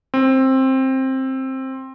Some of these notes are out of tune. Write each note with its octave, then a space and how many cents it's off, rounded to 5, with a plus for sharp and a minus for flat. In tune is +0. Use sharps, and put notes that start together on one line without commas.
C4 +15